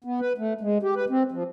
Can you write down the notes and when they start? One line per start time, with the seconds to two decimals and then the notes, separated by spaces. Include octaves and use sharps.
0.04 B3
0.20 B4
0.38 A3
0.61 G#3
0.83 G4
0.95 B4
1.09 C4
1.32 F3